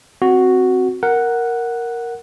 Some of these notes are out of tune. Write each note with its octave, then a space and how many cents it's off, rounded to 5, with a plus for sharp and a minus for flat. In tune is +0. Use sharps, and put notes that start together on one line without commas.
C4 +0 F#4 +0
A#4 +0 F#5 +0